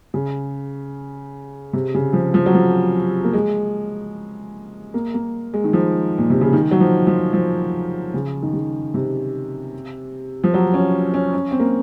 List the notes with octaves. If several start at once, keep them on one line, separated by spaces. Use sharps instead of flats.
C#3
C3
C#3
F3
F3
F#3
F3
A#3
G#3
A#3
A#3
G#3
D#3
F3
A#2
C3
C#3
D#3
F#3
F3
F3
F3
C#3
D#3
C#3
C3
F3
F#3
C#4
C#4
C#4
C4
A#3